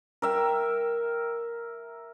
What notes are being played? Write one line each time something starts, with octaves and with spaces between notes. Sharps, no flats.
A#4 E5 G5